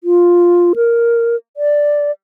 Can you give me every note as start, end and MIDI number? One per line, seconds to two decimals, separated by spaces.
0.04 0.73 65
0.76 1.36 70
1.57 2.11 74